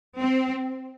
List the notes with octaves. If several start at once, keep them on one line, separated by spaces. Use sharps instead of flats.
C4